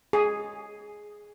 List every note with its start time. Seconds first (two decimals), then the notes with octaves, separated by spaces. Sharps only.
0.13 G#4